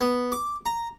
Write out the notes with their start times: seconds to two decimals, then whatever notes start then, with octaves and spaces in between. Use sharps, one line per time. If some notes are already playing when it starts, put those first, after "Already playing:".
0.01 B3
0.32 D6
0.66 A#5